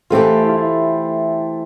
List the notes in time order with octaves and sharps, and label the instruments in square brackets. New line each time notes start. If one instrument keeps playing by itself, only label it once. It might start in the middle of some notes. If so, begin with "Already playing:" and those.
[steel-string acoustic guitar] E3 A3 C4 G4 [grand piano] F4
[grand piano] E4
F4
E4